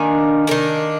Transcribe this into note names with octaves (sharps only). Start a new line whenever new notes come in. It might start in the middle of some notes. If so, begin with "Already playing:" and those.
Already playing: D#3 A#3 D4 G#5
D#3 A#3 D4